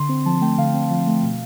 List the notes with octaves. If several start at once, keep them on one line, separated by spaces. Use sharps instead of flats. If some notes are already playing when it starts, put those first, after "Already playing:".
Already playing: D3 C6
C4
F3 A5
A3 G5
D3 F5
C4
F3
A3
B2